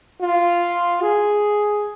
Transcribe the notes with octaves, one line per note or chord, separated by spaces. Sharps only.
F4
G#4